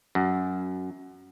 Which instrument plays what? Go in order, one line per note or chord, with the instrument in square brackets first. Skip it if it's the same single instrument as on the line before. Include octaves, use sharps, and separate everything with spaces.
[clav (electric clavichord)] F#2